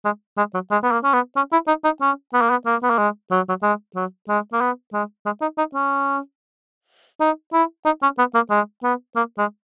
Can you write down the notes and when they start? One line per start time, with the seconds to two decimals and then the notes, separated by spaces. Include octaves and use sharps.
0.05 G#3
0.38 G#3
0.54 F#3
0.71 G#3
0.83 B3
0.92 A#3
1.04 C#4
1.13 B3
1.36 C#4
1.52 E4
1.67 D#4
1.84 D#4
2.01 C#4
2.34 B3
2.41 A#3
2.50 B3
2.66 A#3
2.83 B3
2.90 A#3
2.98 G#3
3.31 F#3
3.49 F#3
3.63 G#3
3.95 F#3
4.29 G#3
4.53 A#3
4.61 B3
4.93 G#3
5.25 G#3
5.41 D#4
5.58 D#4
5.74 C#4
7.20 D#4
7.53 E4
7.85 D#4
8.03 C#4
8.18 B3
8.35 A#3
8.50 G#3
8.83 B3
9.16 A#3
9.38 G#3